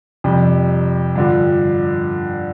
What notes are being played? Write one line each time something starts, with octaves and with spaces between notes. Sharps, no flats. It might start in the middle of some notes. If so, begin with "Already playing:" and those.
F2 C3 G3
G2 D3 F3